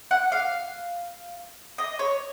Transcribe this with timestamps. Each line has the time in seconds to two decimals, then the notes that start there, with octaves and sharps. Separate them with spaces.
0.11 F#5
0.32 F5
1.78 D#5
1.99 C#5